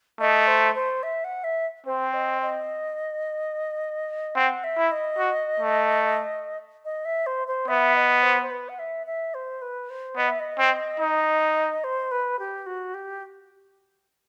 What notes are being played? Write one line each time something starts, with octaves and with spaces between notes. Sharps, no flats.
A3 D#5
C5
C5
E5
F#5
E5
C4 C5
D#5
D#5
C4 F#5
E5
E4
D#5
F#4
A3
D#5
E5
C5
C5
B3 E5
D#5
C5
C5
B4
F#5
E5
E5
C5
B4
C5
B3 D#5
E5
D#5
C4
D#4
C5
B4
G4
F#4
G4